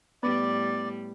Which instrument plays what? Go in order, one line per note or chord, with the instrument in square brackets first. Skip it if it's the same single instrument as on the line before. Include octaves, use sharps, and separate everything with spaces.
[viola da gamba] A2 G3 [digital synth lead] B3 [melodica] D5